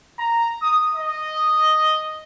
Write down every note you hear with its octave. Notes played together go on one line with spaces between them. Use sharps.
A#5
D#6
D#5